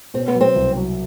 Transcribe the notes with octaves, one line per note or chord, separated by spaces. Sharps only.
B2 C4
B3
F#3
C4
C2
F#3